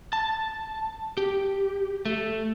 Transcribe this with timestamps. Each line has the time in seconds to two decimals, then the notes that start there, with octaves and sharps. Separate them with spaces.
0.13 A5
1.17 G4
2.05 A3